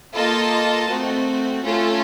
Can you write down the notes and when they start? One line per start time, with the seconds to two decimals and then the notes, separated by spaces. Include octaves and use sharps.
0.14 A#3 F4 A4 D#5 A5
0.89 A3 C4 F#4
1.64 A3 C#4 F4 A4